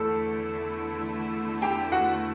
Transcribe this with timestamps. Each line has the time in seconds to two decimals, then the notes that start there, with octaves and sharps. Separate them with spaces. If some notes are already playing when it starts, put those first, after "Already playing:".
Already playing: E2 D3 A3 E4 A4
1.62 G4 G5
1.92 F#4 F#5